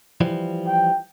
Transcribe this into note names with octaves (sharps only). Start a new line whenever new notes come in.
E3 F3 G3
G5